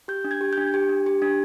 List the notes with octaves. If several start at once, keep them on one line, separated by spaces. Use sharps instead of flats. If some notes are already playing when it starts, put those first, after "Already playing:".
G4 G6
D4
G#6
G4
D4 G6
G4
D4
G4
D4